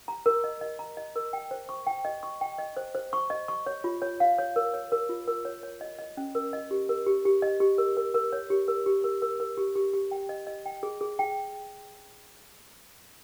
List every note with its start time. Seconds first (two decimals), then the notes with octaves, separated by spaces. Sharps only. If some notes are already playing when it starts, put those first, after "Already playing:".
0.08 A#5
0.26 A#4
0.44 D#5
0.61 D#5
0.79 A#5
0.97 D#5
1.16 A#4
1.33 G5
1.51 C5
1.69 C#6
1.87 G5
2.05 D#5
2.23 C#6
2.41 G5
2.58 D#5
2.77 C5
2.95 C5
3.13 C#6
3.30 D#5
3.48 C#6
3.66 C#5
3.84 F4
4.02 C#5
4.20 F5
4.38 C#5
4.56 A#4
4.74 C#5
4.92 A#4
5.09 F4
5.28 A#4
5.45 C#5
5.63 C#5
5.81 D#5
5.99 D#5
6.17 C#4
6.35 A#4
6.53 D#5
6.71 G4
6.89 A#4
7.06 G4
7.25 G4
7.42 D#5
7.60 G4
7.78 A#4
7.97 A#4
8.14 A#4
8.33 C#5
8.50 G4
8.68 A#4
8.86 G4
9.04 A#4
9.22 A#4
9.40 A#4
9.57 G4
9.76 G4
9.93 G4
10.11 G5
10.29 D#5
10.47 D#5
10.66 G5
10.83 G#4
11.01 G#4
11.19 G5